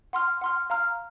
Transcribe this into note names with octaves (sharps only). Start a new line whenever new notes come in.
F#5 C6 F6
F#5 C6 F6
F5 A#5 F6